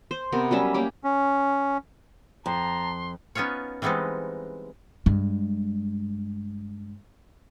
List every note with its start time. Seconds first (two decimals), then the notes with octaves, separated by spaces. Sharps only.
0.11 C5
0.32 C3 B3 A#4
0.51 F#3 G3 C#4 E5
0.74 A#3 C#4 G4
1.04 C#4
2.46 F2 A5 A#5 C6
3.35 B3 C#4 D#4 F4 C#5
3.82 E3 G3 G#3 B3 C4 D#4
5.06 G2 G#3